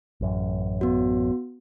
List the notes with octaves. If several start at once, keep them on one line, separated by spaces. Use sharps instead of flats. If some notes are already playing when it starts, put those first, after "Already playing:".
A1 F#2
B3 F#4